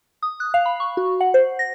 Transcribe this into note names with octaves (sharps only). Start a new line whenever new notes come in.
D#6
F#6
F5
B5
C#6
F#4
F#5
C5
A#6